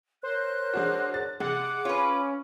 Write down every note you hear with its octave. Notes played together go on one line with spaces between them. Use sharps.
A#4 C5 C#5 F#6
G#3 D4 F#4
A6
C3 G#3 F#5 D6
C#4 F4 B4